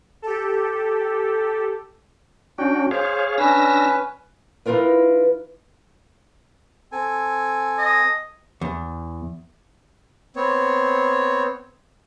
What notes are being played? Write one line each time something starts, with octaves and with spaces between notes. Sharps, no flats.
G4 A4
C#4 D4 F#4 G5
G#4 C5 C#5 F5
C#4 D4 B4 E6 A#6
E3 D#4 F4 A#4 B4
C4 A4 G#5
D#5
E2
B3 C4 C#5